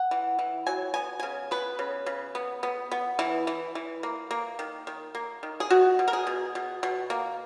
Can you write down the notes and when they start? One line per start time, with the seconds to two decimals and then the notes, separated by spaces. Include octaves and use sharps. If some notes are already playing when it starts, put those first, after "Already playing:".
Already playing: F#5
0.11 E3
0.39 E3
0.67 F#3 G#5
0.94 B3 G#5
1.20 C#3 G#5
1.51 B3 B4
1.79 C#3
2.06 C#3
2.35 B3
2.63 B3
2.91 B3
3.19 E3
3.47 E3
3.75 E3
4.03 A#3
4.31 A#3
4.59 D#3
4.87 D#3
5.15 A#3
5.43 D#3
5.60 G#4
5.70 B2 F#4
5.99 B2
6.08 A#4
6.13 G#4
6.27 B2
6.55 B2
6.83 B2
7.10 A#3